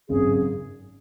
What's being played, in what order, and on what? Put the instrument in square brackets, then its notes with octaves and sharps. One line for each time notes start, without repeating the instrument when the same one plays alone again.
[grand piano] G#1 F#2 C#3 [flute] G#4